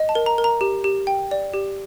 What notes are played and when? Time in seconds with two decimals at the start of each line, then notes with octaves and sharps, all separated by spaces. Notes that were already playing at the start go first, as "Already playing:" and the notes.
Already playing: D#5
0.09 A5
0.15 A#4
0.26 A#5
0.38 A#4
0.44 A#5
0.61 G4
0.84 G4
1.07 G5
1.31 D5
1.54 G4